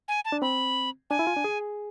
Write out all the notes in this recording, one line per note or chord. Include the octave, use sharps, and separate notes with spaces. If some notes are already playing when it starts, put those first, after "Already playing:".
G#5
A5
D4
C4 B5
D4 G#5
E4
F4
D4
G#4